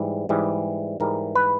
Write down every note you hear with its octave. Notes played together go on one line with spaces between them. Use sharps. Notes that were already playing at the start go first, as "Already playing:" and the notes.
Already playing: G#2 E3 G3
G#2 E3 G3
G#2 E3 G3 A#4
B4